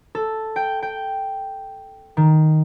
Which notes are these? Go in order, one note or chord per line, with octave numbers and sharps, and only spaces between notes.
A4
G5
G5
D#3